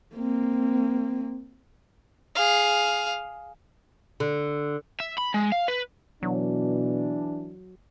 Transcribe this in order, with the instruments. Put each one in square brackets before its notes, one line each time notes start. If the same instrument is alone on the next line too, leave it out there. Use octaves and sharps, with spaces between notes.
[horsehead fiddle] A#3 C4
[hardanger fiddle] G#4 F5
[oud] D3
[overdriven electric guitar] E5
B5
G#3
F5
B4
[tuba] B2 [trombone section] E3 D4 [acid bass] F#3